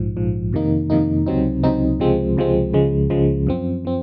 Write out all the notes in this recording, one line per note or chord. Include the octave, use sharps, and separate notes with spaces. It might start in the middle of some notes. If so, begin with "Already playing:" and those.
Already playing: A#1 G#2 F3
A#1 G#2 F3
F2 C3 D#3 A#3 D#4
F2 C3 D#3 A#3 D#4
C#2 C3 F#3 C4 D#4
C#2 C3 F#3 C4 D#4
C#2 C3 F3 G#3 C4
C#2 C3 F3 G#3 C4
C#2 C#3 F3 G#3
C#2 C#3 F3 G#3
F#2 F3 C4
F3 C4